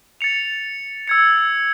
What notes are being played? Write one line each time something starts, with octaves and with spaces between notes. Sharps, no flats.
A6 C#7 F7
E6 G#6 C#7